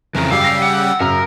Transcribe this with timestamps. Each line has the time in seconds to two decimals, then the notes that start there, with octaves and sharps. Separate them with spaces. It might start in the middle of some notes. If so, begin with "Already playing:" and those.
0.15 F2 C#3 E3 A#4
0.31 F#2 C#3 G3 G4 F5 E6
0.44 A#6 C7
0.62 F#5
1.00 F#2 C#3 A#4 A#5